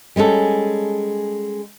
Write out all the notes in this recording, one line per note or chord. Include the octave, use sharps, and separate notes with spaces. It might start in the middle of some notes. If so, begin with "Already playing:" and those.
G3 G#3 C#4 A4